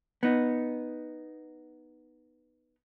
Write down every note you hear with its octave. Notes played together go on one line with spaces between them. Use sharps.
B3 D#4